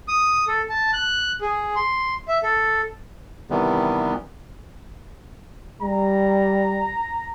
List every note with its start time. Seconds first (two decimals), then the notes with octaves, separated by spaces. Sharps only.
0.08 D#6
0.48 A4
0.70 A5
0.93 F#6
1.41 G#4
1.76 C6
2.28 E5
2.43 A4
3.50 C3 D#3 E3 G3 B3
5.82 G3 A#5